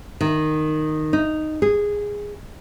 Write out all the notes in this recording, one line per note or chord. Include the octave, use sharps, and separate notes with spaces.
D#3
D#4
G#4